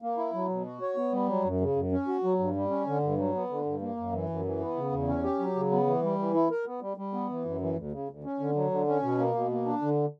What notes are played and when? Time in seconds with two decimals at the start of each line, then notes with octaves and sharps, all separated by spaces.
0.02 A#3
0.17 E4
0.34 F#3
0.49 B2
0.66 F#4
0.82 C#5
0.96 B3
1.13 G3
1.29 F#3
1.44 F#2
1.61 C#3
1.76 F#2
1.92 C#4
2.08 F#4
2.24 F#3
2.39 G2
2.56 G3
2.70 C#4
2.87 D3
3.03 G2
3.18 F#3
3.35 B3
3.50 D3
3.66 G2
3.81 A#3
3.97 F#2
4.12 E3
4.29 F#2
4.45 E3
4.60 B3
4.76 C#3
4.92 E2
5.08 C#4
5.23 G4
5.40 F#3
5.56 C#3
5.71 B3
5.87 E3
6.03 G3
6.19 E3
6.34 E4
6.51 A#4
6.66 B3
6.81 G3
6.97 G3
7.13 B3
7.29 E3
7.45 F#2
7.61 E3
7.76 D2
7.92 C#3
8.09 D2
8.24 C#4
8.40 D3
8.55 F#3
8.71 D3
8.87 C#4
9.02 B2
9.18 A#3
9.35 B2
9.51 A#3
9.66 D4
9.82 D3